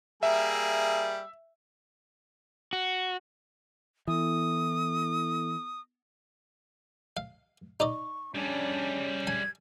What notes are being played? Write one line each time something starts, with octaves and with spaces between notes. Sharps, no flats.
G3 A#3 G#4 E5
F#4
E3 B3 E4 A4 D#6
F5
D#4 D5 D#5 C#6
G3 C#4 D4 G#4
G#5 G#6